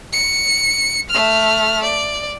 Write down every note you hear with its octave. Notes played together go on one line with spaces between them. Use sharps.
C#7
A3 F6
D5